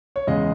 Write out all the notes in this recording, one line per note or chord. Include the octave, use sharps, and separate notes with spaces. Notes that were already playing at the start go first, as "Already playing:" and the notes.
C#5
E2 C#3 G#3 D#5